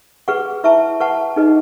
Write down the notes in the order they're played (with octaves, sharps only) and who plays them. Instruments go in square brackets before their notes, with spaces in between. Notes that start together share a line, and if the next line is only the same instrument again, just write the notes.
[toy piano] G#4 B4 F#5 C#6
E4 B4 E5 A5 C#6
B4 F#5 A5 C#6
D#4 G#4 B4 D#5